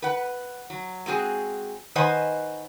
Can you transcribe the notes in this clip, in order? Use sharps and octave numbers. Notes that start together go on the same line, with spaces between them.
B4 F#5
F#3
G#3 C4 F#4 G#4
D#3 B4 C5 D#5 F#5 G#5